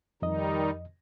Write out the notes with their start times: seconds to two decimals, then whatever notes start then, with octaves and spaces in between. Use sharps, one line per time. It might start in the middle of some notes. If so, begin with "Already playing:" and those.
0.22 F2 D#3 G3 D#4 D#5